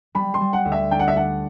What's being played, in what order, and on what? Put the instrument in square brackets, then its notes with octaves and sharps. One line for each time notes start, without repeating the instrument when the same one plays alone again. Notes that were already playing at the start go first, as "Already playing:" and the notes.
[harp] G3 [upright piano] B5
[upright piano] C6
[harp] G3
[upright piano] F#5
[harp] D2
[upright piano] E5
[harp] D4 [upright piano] G5
[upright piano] F#5
E5
[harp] D4 [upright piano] F#5